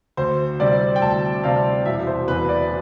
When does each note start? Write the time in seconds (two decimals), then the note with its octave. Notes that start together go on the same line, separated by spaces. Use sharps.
0.17 D2 C5
0.59 C3 G3 C4 D5
0.96 G5
1.01 D2 A5
1.43 C3 G3 C4 F5
1.85 E1 E5
2.07 C5
2.28 E2 B2 B4
2.49 D5